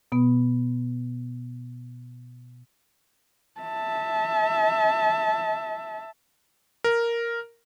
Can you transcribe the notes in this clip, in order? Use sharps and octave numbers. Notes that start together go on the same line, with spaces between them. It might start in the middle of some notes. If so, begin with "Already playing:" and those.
B2 B3
E5 A5
A#4